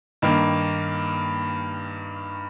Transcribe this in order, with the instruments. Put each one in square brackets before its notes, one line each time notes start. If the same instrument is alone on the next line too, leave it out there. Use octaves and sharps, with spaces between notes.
[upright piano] G2 D#3 A#3